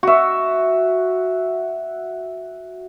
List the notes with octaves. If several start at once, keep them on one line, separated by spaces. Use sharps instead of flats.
F#4 E5